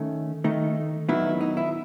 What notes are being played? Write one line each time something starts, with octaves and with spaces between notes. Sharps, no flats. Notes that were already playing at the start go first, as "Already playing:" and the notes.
Already playing: D#3 A3 C#4
D#3 A3 D#4
D#3 F#3 B3 D#4 E4
D#4
E4